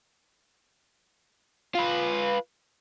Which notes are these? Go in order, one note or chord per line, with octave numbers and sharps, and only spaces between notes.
F4 B4